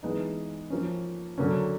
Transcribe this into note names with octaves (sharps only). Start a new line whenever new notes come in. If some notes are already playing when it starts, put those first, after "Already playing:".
E3 G#3 B3 D#4
F3 A#3 C#4
D3 F#3 A#3 C#4